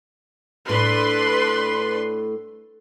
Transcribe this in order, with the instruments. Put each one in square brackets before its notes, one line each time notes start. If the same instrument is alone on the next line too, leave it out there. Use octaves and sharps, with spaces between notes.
[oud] A2 [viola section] D4 B4 C6